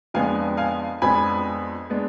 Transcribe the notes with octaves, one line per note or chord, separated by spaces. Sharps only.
F2 F3 G#3 B3 D4 F5 G#5
F5 G#5
F2 F3 G#3 B3 D4 G#5 B5
G#3 B3 D4